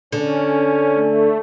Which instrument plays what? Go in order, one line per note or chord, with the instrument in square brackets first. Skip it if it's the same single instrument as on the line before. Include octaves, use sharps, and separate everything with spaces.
[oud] D3 [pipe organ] C#4
[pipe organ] A3